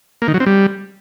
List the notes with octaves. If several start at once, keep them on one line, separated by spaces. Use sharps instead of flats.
A#3
D#3
F#3
C4
G3